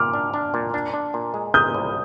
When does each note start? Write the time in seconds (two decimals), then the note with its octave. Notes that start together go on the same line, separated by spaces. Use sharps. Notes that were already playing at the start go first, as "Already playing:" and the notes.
Already playing: A#2 D6 F6
0.13 D4
0.34 D4
0.54 A#2
0.74 D4
0.94 D4
1.14 A#2
1.34 G#3
1.54 A#2 D#6 G6
1.74 C2